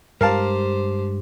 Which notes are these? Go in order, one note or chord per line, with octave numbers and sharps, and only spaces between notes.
G2 G#3 G4 A#4 C5 F5 A5